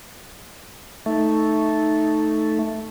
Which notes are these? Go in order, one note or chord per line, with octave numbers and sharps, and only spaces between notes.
A3 D#4